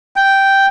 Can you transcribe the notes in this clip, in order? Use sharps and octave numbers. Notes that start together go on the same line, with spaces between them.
G5